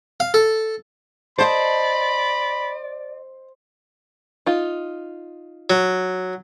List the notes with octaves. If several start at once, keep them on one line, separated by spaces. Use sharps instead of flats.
F5
A4
C5 D5 D#5 A5 B5
D#4 F4
F#3